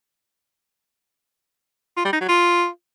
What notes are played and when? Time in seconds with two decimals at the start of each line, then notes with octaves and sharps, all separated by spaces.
1.97 F4
2.05 G3
2.13 D#4
2.21 F#3
2.28 F4